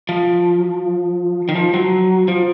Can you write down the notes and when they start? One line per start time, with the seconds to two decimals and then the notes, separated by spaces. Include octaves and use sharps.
0.09 F3
1.49 D#3
1.55 F3
1.74 F#3
2.28 F3